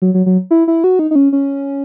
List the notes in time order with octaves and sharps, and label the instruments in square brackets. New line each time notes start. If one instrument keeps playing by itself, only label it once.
[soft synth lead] F#3
F#3
F#3
E4
E4
F#4
D#4
D#4
C#4
C#4